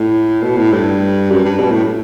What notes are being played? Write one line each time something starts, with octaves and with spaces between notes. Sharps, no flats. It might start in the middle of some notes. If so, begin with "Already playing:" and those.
Already playing: A2
B2
A2
G2
F#2
G2
B2
A2